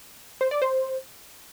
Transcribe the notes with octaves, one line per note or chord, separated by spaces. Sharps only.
C5
D5
C5